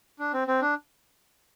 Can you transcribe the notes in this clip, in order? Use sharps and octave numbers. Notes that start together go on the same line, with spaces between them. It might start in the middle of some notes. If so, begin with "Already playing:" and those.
D4
C4
C4
D4